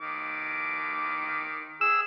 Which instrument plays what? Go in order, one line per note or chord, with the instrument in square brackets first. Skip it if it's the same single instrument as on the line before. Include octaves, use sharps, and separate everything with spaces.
[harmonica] D#3 D6
[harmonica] G#4 [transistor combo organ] E6